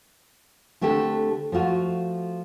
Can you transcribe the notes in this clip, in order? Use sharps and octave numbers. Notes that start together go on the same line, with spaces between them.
D3 A3 C4 G4 A4
F3 A3 F4 F#4